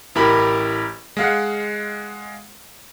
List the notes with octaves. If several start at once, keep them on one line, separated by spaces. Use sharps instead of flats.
A1 E4 G4 A#4 B5
G#3 F5 F#5